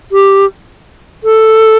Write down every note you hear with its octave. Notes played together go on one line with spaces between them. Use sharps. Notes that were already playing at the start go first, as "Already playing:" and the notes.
G4
A4